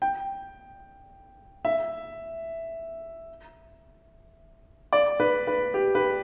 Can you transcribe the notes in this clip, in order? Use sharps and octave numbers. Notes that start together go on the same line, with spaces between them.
G5
E5
D5
B4
B4
G4
B4